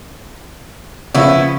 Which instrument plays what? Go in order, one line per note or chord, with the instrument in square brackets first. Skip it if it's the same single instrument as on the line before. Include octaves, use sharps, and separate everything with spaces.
[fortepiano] C#3 F3 C#4 [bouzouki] B3 E4